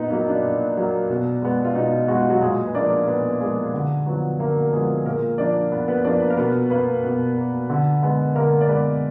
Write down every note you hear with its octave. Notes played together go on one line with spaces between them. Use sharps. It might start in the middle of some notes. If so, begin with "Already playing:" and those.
Already playing: A#2 B3 D#4 B4
F#3 A#3 D#4
D4
A#2
F#3 A#3
B2
G#3 B3
F4
B2 D#4
G#3 B3 F#4
F4
F#3 F#4
A#2 G#3 G#4
B4
F3 A#3 D4 D5
A#2 B3 B4
F3 G#3 A#3 G#4
D3
F3 F#3 B3 F#4
D3 A#3 A#4
A#4
F3 G#3 B3 G#4
A#2 A#3 A#4
F3 A#3 D4 D5
A#2 B3 B4
B3 B4
F3 A#3 D4 D5
B3 B4
A#4
B2 B3 B4
A#3 B3 B4
B2
A#3
D3
G#3 B3
D3 A#3 A#4
D5
G#3 B3 B4